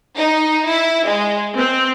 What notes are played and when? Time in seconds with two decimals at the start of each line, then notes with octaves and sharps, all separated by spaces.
0.18 D#4
0.68 E4
1.07 G#3
1.58 C4